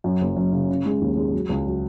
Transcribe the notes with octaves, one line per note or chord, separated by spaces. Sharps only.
F#2
F#1
F#2
C#3
C#3
G#3
D#2
G#3
F#3
C#2
F#3